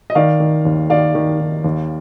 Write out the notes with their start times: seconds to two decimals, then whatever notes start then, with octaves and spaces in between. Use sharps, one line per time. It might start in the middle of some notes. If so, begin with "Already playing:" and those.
0.10 D#5
0.15 D#3 D5 F5
0.40 D#3
0.65 D#2
0.90 D#3 D5 F5
1.15 D#3
1.40 D#3
1.64 D#2